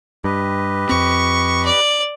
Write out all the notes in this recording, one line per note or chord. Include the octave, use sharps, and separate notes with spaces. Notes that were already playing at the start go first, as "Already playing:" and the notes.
G2 G4 B4 D#5
F2 C4 C#6
D5